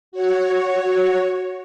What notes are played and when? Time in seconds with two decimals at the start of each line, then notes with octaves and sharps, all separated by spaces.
0.12 F#4 C#5